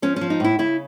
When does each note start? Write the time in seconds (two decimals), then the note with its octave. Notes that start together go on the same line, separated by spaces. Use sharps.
0.02 F3 C#4
0.16 F3 C#4
0.30 D#4
0.40 A2 E4
0.59 C#3 E4